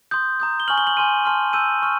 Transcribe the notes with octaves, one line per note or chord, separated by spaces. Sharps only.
C6 D#6 G6
A#5 D#6 G6
G7
G#5 C#6 F6 F#7
G7
F#7
G#5 C6 F6 D#7
A5 C6 F6
C6 E6 G6 D#7
C#6 F6